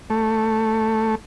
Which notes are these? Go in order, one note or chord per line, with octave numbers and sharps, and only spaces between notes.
A3